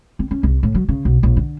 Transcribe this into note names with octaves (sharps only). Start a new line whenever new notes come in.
C4
C#4
C2
A2
F#3
C#3
B1
A#1
D3